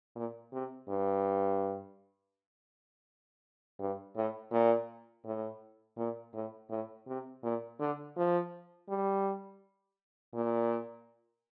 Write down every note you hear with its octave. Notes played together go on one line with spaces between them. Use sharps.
A#2
C3
G2
G2
A2
A#2
A2
A#2
A2
A2
C3
A#2
D3
F3
G3
A#2